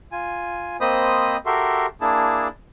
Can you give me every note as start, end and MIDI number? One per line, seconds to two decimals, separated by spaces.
0.12 0.77 65
0.12 0.77 80
0.81 1.37 58
0.81 1.37 60
0.81 1.37 72
0.81 1.37 75
0.81 1.37 83
0.81 1.37 87
1.46 1.86 66
1.46 1.86 67
1.46 1.86 69
1.46 1.86 70
1.46 1.86 76
1.46 1.86 84
2.01 2.48 58
2.01 2.48 62
2.01 2.48 64
2.01 2.48 68
2.01 2.48 81